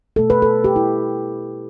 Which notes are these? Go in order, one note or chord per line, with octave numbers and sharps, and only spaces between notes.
B2 A3 A4
B4
A4
G4
E4